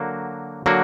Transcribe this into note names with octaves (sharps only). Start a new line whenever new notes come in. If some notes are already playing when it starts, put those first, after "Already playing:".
Already playing: D3 F#3 A#3 F#4
D3 F#3 A#3 F#4